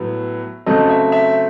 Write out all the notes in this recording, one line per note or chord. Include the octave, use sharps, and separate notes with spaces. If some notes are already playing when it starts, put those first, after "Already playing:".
Already playing: A2 F#3 B3
C#3 F#3 A3 C4 D#5
E5
E5